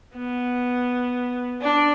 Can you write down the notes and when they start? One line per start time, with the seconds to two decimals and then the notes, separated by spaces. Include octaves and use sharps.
0.16 B3
1.62 D4